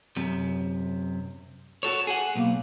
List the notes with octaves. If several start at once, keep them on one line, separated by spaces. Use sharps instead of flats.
F#2 C3
F#4 A4 C#5
G#4 F#5
B1 A#3